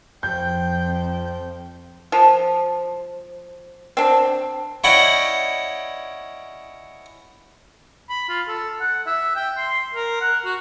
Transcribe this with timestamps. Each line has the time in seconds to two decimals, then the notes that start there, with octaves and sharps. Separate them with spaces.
0.23 F2 F3 G5 G6
2.12 F3
3.97 C4 D4
4.84 C#4 E4 D5 D#5 F#5 G5
8.10 B5
8.29 F4
8.48 A4
8.80 F#5
9.07 E5
9.36 G5
9.57 C6
9.94 A#4
10.21 F#5
10.45 F#4